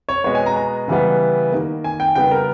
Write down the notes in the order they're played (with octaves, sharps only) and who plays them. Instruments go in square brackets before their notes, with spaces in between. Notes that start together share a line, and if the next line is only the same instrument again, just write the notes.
[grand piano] C#5
B2 G#3 B3 C#5
G#5
A#5
A#5
C#3 E3 G3 B3
D#3 A#3
G#5
G5
C#3 G3 B3 G5
A#4